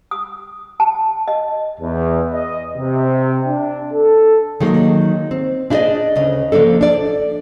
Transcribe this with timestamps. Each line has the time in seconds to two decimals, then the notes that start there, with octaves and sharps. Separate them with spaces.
0.11 D#6
0.80 A5
1.28 D#5
1.81 E2
2.33 D#5
2.78 C3
3.48 D4
3.93 A4
4.60 D#3 F#3 G#3 A#3
5.31 C4
5.70 D4 E4 G#4 A#4 D5 D#5
6.16 D2 C#3 D#5
6.52 F3 G#3 A#3 D4 A4
6.81 D4 D5